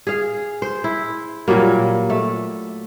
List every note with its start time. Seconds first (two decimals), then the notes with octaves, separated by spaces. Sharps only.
0.07 G#4 F5
0.62 C5
0.84 E4
1.48 A#2 F#3 G3 A#3
2.10 A3